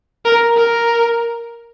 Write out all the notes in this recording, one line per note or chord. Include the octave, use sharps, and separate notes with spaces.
A#4
A#4